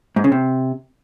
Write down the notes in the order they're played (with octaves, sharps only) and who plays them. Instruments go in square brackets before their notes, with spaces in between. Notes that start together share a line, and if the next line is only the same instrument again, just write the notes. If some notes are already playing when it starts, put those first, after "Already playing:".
[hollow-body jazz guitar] G#2
C#3
C3